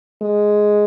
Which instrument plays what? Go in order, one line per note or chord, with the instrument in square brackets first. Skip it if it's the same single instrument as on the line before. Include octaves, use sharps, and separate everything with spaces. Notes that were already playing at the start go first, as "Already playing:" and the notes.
[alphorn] G#3